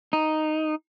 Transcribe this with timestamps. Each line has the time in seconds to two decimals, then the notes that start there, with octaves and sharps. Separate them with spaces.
0.13 D#4